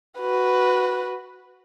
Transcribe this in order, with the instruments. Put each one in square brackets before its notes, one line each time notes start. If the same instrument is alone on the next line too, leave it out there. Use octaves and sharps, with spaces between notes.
[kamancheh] F#4 B4